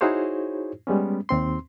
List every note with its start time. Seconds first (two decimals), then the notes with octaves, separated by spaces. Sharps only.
0.01 D#4 E4 F#4 G#4 C5 C#5
0.87 G3 G#3 B3 C#4
1.29 D#2 C4 C6